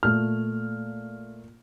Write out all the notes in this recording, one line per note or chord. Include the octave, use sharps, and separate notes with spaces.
A#2 A3 F6